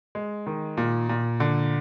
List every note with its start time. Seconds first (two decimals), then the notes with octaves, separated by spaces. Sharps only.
0.15 G#3
0.47 D#3
0.77 A#2
1.09 A#2
1.40 D3